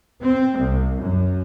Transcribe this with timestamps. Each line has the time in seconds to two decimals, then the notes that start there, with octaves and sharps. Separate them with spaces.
0.22 C4
0.57 C2
0.99 F#2